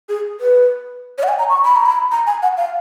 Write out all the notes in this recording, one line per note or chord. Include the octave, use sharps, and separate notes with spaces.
G#4
B4
C#5
F#5
G#5
A#5
C#6
B5
A#5
B5
A#5
G#5
F#5
F5